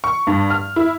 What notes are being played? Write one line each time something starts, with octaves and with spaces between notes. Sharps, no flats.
C#6
G2
F6
E4